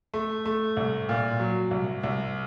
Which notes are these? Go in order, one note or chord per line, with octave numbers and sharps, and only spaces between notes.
A3
A3
C2
A#2
F#3
C2
C2